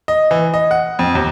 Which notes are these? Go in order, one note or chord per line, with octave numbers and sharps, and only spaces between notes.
D#5
E3
D#5
F#5
F2
D#2